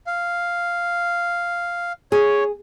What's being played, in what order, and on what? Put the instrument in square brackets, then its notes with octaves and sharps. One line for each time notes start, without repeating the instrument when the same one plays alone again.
[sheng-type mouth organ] F5
[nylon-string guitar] G#4 [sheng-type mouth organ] C#5